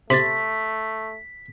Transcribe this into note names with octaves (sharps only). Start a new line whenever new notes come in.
C3 A3 C6 A6 B6